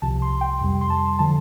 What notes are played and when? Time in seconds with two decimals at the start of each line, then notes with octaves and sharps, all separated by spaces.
0.02 C2 C3 F3 A5
0.22 C6
0.41 G5
0.61 F2 C3 G3
0.81 C6
0.90 A5
1.19 D3 F3 A5